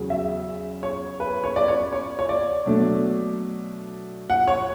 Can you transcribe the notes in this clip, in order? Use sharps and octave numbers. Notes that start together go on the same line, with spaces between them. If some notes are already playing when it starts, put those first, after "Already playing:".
Already playing: E2 C#3 F#3
E5
C#5
B4
C#5
D5
C#5
C#5
C#5
D5
B2 F#3 A3 D4
F#5
C#5